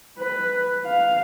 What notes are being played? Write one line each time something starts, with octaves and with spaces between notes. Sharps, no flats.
B4
F5